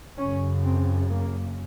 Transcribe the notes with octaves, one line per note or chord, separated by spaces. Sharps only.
F#2 C#3 C#4
C4
A#3